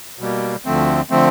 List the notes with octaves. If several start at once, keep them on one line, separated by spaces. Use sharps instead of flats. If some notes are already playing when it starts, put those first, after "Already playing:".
B2 G3 A#3
D2 D3 F3 A3 C4
D3 F3 A3 C4